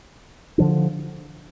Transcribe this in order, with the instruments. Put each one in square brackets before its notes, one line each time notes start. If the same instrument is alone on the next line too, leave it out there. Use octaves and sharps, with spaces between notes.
[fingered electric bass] D3 F3 D4